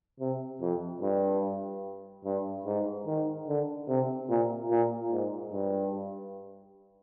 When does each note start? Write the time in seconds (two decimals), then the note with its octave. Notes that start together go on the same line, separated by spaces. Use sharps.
0.20 C3
0.61 F2
1.02 G2
2.25 G2
2.66 G#2
3.06 D#3
3.47 D3
3.88 C3
4.29 A#2
4.70 A#2
5.11 G#2
5.52 G2